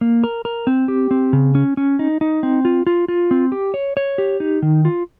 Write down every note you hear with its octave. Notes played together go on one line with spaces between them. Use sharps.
A#3
A#4
A#4
C4
G4
C4
C#3
C#4
C#4
D#4
D#4
C4
F4
F4
F4
C4
G4
C#5
C#5
G4
D#4
D#3
F4